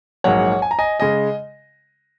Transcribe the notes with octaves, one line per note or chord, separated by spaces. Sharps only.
A#1 G#2 F#3 A#3 C#5 F#5
G#5
A#5
D#5 G#5
C#3 G#3 D#5 G#5